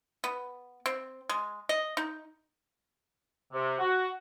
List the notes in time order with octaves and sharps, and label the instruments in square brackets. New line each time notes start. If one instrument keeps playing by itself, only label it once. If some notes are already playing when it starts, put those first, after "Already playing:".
[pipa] B3
C4
G#3
D#5
D#4
[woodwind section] C3
F#4